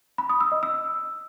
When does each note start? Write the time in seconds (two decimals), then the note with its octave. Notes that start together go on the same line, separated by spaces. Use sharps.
0.18 B5
0.29 D#6
0.41 E6
0.52 D#5
0.63 E6